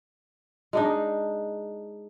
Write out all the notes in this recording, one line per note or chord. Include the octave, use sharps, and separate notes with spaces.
G#3 D4 D#4